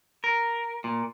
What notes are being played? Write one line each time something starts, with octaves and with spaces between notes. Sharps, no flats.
A#4
A#2